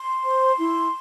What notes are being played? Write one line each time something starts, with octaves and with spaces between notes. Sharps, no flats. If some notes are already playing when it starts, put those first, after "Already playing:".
Already playing: C6
C5
E4